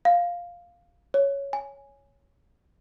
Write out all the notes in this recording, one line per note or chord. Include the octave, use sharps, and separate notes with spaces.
F5
C#5
G#5